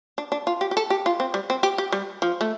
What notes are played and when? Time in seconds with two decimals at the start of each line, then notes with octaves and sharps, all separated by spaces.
0.18 D4
0.32 D4
0.47 F4
0.61 G4
0.71 G4
0.77 A4
0.90 G4
1.06 F4
1.20 C4
1.34 G3
1.50 C4
1.63 G4
1.78 G4
1.92 G3
2.22 F3
2.41 A3